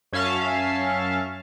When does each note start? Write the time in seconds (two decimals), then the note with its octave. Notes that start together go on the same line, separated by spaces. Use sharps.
0.13 F#2 C#4 E5 F5 A5